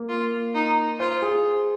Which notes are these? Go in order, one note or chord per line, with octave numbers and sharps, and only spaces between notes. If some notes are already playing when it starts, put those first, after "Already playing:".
Already playing: A#3
F4
D#4
F4 C5
G#4